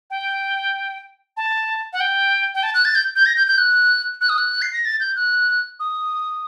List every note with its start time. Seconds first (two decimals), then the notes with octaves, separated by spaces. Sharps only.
0.10 G5
1.37 A5
1.93 F#5
2.00 G5
2.55 G5
2.63 A5
2.74 F#6
2.85 A6
2.95 G6
3.16 G6
3.26 A#6
3.37 G6
3.48 G6
3.58 F#6
4.21 F#6
4.29 D#6
4.38 F#6
4.62 C7
4.73 A#6
4.85 A6
5.00 G6
5.16 F#6
5.80 D#6